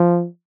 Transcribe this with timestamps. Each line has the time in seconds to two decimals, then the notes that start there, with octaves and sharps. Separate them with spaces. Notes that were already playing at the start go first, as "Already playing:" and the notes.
Already playing: F3